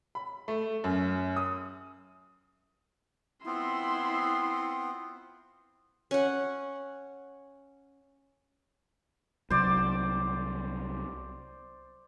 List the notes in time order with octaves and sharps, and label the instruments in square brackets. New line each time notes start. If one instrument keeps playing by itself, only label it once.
[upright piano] B5
A3
F#2
D#6
[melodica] B3 C4 F4 [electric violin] E4 C6
[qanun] C#4 F#5
[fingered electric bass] C2 F#3 [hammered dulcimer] C5 D5